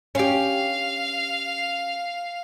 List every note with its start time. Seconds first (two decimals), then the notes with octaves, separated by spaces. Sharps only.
0.15 C#4 G4 F5